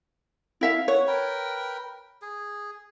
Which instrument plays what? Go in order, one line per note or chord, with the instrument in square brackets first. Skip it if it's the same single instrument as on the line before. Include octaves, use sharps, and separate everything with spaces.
[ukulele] E4 E5 F5
[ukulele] C#5 [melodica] F#5
[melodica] A#4 B4 G5
G#4